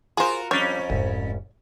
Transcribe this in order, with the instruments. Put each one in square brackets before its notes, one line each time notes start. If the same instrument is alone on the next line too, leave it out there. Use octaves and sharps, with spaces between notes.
[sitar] F4 F#4 A#4 [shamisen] G#4 C5
[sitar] F2 C#4 [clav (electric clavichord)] G3 D4 [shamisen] C#5
[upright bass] F1 G#2 [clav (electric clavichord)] C2